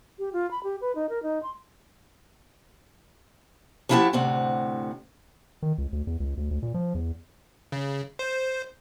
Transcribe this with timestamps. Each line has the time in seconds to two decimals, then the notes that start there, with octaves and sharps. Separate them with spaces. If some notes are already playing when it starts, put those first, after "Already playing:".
0.19 G4
0.33 F4
0.51 B5
0.64 G4
0.81 B4
0.95 D#4
1.09 A#4
1.23 D#4
1.43 C6
3.89 F3 A#3 E4 F#4 G4 A5
4.13 D2 A2 C3 C4 F#5
5.62 D#3
5.78 C#2
5.93 D2
6.07 E2
6.20 C#2
6.37 D2
6.51 D2
6.63 A#2
6.74 F3
6.95 E2
7.72 C#3
8.19 C5